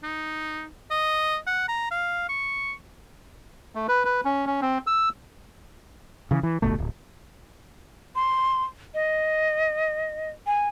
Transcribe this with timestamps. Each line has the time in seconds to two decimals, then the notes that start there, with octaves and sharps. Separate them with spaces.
0.03 D#4
0.91 D#5
1.47 F#5
1.68 A#5
1.91 F5
2.29 C#6
3.75 A3
3.88 B4
4.05 B4
4.25 C#4
4.47 C#4
4.61 C4
4.87 E6
6.31 C#3 E3
6.43 E3
6.62 D1 G1 B2 A3
6.78 D1
8.16 C6
8.94 D#5
10.47 G#5